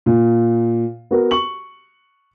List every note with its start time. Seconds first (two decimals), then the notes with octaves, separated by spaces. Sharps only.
0.06 A#2
1.11 B3 F#4 A#4
1.31 C#6 F#7